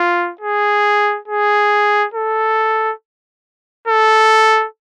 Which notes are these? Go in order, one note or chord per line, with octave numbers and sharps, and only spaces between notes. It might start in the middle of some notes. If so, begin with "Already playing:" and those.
Already playing: F4
G#4
G#4
A4
A4